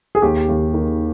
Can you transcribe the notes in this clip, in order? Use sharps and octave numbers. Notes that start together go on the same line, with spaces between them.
G#4
D#2 G4
D#2
D#3